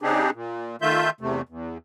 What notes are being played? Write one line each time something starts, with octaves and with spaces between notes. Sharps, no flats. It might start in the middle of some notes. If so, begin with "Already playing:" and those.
C#3 C4 D4 D#4 G4 G#4
A#2
D#3 A3 F4 E5 G6
E2 C3 A3
E2